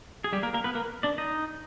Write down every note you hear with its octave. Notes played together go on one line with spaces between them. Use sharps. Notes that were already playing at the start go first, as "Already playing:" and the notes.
G#4
G3 G4
A#3 A#4
A#3 A#4
B3 B4
A#3 A#4
D4 D5
D#4 D#5